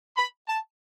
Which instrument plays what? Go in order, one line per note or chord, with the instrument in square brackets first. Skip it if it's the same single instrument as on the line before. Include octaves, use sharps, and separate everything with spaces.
[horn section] B5
A5